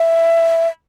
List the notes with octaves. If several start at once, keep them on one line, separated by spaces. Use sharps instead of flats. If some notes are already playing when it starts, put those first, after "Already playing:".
Already playing: E5